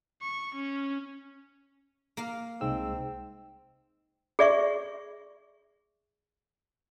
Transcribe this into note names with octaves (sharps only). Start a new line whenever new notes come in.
C#6
C#4
A#3 F5
C2 G#3 C4 D#4 E6
G#4 D5 E5 C#6